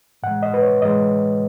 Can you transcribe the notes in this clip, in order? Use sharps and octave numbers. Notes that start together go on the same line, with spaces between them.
A2 E3 G#3 F#5
D#5
B4
C#5
A2 E3 G#3 D#5